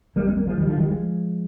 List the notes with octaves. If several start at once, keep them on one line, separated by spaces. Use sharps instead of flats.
G3 A#3
G#3 C4
G3 A#3
F3 G#3
D#3 G3
D3 F3
D#3 G3
F3 G#3